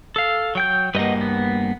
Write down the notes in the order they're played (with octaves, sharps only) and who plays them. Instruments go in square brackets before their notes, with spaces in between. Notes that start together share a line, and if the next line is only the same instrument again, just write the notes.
[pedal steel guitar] A4 F5
F#3 G5 G6
[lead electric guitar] G2 A#3 [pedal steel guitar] B4 D#5 F#5
[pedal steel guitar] B3